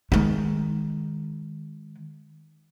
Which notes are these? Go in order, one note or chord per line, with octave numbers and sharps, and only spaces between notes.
D#3 G#3